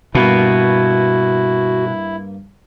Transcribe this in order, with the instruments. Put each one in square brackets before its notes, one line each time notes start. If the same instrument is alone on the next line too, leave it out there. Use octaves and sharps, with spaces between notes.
[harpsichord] G2 A#3 [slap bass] B2 [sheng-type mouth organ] E4 [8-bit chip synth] F#4